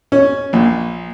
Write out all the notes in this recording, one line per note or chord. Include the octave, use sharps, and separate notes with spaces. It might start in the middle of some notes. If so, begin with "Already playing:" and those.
C#4
A#1